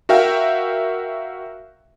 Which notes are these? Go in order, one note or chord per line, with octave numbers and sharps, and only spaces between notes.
F#4 A#4 E5 F5 G5